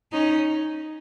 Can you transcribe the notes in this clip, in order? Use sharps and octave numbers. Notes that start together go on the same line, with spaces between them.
C#4 D#4